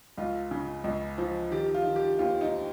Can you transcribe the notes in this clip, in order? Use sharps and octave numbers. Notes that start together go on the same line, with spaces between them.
C#2 F4
C#3
C#2
F3
D#3 G4
F4
D#3
G4
D#2 F4
D#4